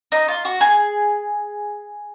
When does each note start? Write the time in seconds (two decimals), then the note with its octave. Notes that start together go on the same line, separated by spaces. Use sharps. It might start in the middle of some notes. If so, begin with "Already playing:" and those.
0.12 D#4
0.28 F4
0.45 F#4
0.61 G#4